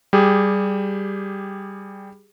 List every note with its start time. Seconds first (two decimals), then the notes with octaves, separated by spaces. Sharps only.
0.13 G3 G4 G#4